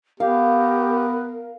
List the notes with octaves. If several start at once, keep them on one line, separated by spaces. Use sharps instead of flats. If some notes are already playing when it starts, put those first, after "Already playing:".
B3 G4 A#4 F5